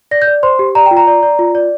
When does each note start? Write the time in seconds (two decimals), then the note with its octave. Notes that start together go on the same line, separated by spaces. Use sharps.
0.11 D5 A#6
0.22 G6
0.27 D5
0.43 C5 C6
0.59 G4
0.75 D5 A#5
0.86 F4 G5
0.97 A#5
1.07 D5
1.23 D5
1.39 F4
1.55 D5